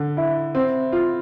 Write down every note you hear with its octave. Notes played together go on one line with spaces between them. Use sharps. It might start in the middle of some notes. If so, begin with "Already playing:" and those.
Already playing: D3
E4
C4
F4